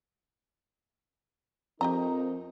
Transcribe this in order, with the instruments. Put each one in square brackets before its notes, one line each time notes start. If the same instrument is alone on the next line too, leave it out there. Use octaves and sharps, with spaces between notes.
[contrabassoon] F2 [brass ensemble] F3 D#4 A#4 [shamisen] G4 D#5 A#5